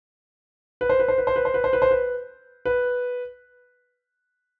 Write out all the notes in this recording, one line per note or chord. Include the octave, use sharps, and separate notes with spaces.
B4
C5
B4
C5
B4
C5
B4
C5
B4
C5
B4
C5
B4
B4